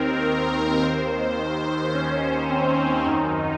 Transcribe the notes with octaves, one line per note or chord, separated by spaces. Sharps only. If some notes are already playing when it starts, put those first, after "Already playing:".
Already playing: D#2 D#3 C4 A#4
D#2 D#3 C5
C#4
C4
F#2 D#3 D#4